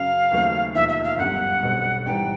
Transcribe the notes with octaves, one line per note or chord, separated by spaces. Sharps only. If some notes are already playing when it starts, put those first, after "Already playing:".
Already playing: F#2 C#3 F#3 F5
D#2 C#3 F#3 A3 C4
E1 D#2 D3 F3 E5
E5
F5
G1 F#2 D3 G3 F#5
B1 B2 G3 C4
G#1 G#2 E3 G3 G5